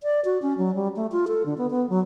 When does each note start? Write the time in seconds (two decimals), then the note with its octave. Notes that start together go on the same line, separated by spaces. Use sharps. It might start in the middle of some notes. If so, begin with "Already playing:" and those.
0.03 D5
0.25 F#4
0.42 C#4
0.58 F#3
0.75 G3
0.96 A3
1.12 F4
1.28 A4
1.46 D3
1.58 B3
1.70 B3
1.89 F#3